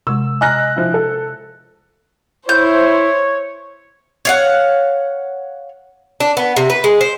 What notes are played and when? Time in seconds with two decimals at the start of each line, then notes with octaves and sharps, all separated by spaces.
0.07 C3 G#3 E6
0.41 D#5 G#5 A#5 F6 F#6 A#6
0.76 F3 E4
0.94 A4
2.49 E4 C5 C#5 G6
4.25 C#5 F5 F#5
6.20 D4
6.37 B3
6.56 C3
6.70 B4
6.84 G#3
7.01 C5